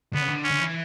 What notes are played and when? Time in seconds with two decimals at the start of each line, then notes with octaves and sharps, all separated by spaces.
0.14 D3 B3
0.22 C#3
0.29 D3
0.44 C#4
0.51 D3
0.59 E3